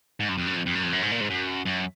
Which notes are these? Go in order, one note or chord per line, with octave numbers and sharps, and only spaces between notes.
G#2
F#2
F2
F#2
F2
F2
F#2
F2
F#2
G#2
A#2
G#2
F#2
F#2